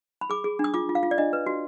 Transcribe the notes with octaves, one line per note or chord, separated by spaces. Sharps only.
B5
G#4 D6
G#4
D4
D#6
F4 D6
F4
F5
F4
D5
D4 D#5
B4
F#4